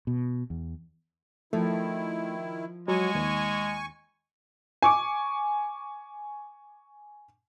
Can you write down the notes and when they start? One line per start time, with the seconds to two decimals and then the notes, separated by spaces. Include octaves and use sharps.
0.07 B2
0.50 E2
1.53 D#3 F3 A3 E4
2.88 F#3 G#3 G#5 C#6
3.15 D#2
4.82 G#5 C#6 D6